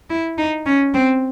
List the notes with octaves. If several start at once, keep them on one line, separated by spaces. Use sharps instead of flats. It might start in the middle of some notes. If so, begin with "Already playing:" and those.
E4
D#4
C#4
C4